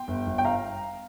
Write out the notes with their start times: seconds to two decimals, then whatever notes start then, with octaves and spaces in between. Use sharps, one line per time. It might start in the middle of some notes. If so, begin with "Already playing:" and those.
Already playing: G5 C6
0.08 G1
0.27 G1
0.38 G5
0.45 F5 A#5